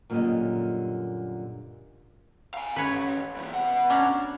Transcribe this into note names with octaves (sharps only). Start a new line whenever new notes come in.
F#2 A#2 D3 G3 G4 D#5
F5 G#5
E3 C#4 B4 C#5
G2 E3
B2 F#5
C#4 D4 A#5